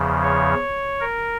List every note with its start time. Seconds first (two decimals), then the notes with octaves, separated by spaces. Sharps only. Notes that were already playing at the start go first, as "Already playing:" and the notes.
Already playing: E2 C#3 F3
0.22 C#5
1.01 A#4